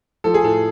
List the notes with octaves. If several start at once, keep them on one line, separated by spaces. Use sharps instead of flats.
F3 A4
G#4
A2 A4